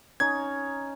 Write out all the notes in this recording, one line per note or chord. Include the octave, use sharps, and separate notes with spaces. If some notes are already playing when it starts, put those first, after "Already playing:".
C#4 D#4 A#5 G#6